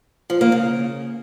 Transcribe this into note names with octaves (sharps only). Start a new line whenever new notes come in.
F3
A#3
C#3